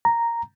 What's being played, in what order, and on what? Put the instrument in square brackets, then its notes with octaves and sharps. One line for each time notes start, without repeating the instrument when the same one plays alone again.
[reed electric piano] A#5